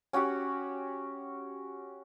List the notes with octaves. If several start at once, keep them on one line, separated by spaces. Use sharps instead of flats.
C#4 F#4 G4 F#5